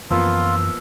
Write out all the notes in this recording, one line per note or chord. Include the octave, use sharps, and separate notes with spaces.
F#2 E3 F3 A#3 B3 F4 E6